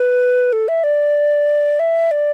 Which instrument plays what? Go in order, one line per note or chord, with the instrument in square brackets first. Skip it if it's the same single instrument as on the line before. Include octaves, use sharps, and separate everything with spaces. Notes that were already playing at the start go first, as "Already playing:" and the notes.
Already playing: [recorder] B4
A4
E5
D5
E5
D5